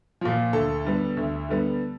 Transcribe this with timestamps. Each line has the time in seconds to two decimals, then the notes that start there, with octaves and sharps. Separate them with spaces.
0.21 A#2 F3
0.53 D2 A4
0.85 D3 G3 B3
1.17 D2
1.49 D3 G3 B3